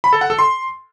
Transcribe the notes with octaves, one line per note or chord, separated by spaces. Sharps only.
B5
A4
F#5
A4
C6